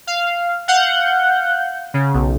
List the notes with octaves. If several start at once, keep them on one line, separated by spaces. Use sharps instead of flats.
F5
F5 F#5 G6
C#3
B1